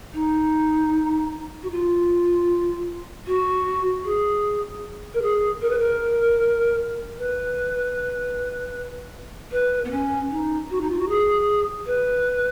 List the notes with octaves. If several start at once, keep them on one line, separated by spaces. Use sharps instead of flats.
D#4
F#4
F4
F#4
G#4
A#4
G#4
A#4
B4
A#4
B4
B4
B3
C#4
D#4
F#4
D#4
F4
F#4
G#4
B4